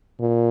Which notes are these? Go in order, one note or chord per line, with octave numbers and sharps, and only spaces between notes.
A#2